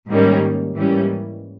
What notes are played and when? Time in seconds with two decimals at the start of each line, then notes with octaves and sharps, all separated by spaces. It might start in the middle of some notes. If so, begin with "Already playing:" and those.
0.09 G#2 D#3 G3 A#3 C#4
0.75 G#2 E3 G3 A#3 C#4